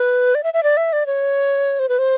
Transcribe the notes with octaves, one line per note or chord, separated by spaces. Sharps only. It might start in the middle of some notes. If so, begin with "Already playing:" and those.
Already playing: B4
D5
E5
E5
D5
E5
D5
C#5
C5
B4
C5